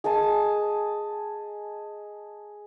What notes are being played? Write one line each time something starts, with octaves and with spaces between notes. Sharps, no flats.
G#4 D#5 G#5 A5